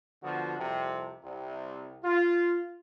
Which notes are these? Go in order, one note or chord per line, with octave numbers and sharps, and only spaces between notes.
D3 F3 B3 F#4
C2 F2 C3
C2 C3
F4